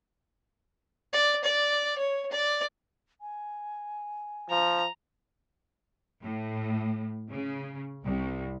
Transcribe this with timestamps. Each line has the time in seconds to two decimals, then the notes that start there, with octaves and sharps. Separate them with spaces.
1.13 D5
1.44 D5
1.98 C#5
2.32 D5
3.21 G#5
4.50 F3 A#5
6.23 A2
7.30 C#3
8.06 C2